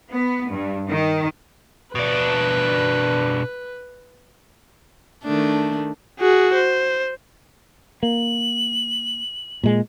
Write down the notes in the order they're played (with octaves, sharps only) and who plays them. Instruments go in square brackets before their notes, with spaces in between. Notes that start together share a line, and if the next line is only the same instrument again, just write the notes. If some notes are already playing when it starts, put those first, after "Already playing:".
[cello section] B3
G2
D#3
[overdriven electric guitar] B2 D4 [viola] B4
[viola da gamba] D#3 A3 D4
[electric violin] F#4 G#4
C5
[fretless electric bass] A#3 [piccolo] F#7
[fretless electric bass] A#2 G#3